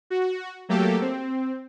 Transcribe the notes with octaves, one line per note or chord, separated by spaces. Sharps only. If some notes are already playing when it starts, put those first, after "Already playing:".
F#4
F#3 A3 A#3 G4 A4
C4